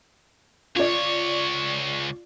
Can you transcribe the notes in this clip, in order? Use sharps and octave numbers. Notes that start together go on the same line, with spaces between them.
C#2 F4 C#5 D5